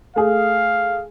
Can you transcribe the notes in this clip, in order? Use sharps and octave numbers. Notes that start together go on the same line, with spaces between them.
A3 G#4 F5